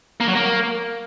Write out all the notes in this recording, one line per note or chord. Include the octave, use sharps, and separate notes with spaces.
A#3
F#3
A#3